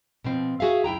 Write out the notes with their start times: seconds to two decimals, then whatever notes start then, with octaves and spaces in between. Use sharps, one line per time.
0.24 B2 F3 C4
0.60 F#4 G#4 E5 F5
0.84 F#2 E4 G5 A#5